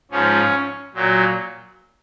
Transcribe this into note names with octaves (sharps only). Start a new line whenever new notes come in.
G#2 F3 C#4
A#2 F#3